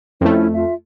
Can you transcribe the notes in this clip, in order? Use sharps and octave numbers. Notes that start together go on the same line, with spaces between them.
F2 A3 C#4 E4
F4 E5